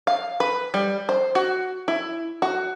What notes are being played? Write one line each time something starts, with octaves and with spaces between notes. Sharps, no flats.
F5
B4
G3
C5
F#4
E4
F#4